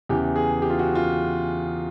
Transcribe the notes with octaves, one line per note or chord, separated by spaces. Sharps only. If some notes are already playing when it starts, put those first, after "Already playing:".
E2 C#3 E3 G4
G#4
G4
F4
F#4
F4